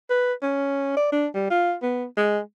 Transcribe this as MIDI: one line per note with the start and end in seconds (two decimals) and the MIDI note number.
0.10 0.33 71
0.42 0.93 61
0.97 1.08 74
1.12 1.27 62
1.34 1.45 55
1.50 1.74 65
1.83 2.04 59
2.17 2.39 56